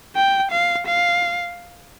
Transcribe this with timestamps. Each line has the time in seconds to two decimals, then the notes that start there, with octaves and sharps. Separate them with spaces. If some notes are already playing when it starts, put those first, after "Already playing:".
0.15 G5
0.51 F5
0.87 F5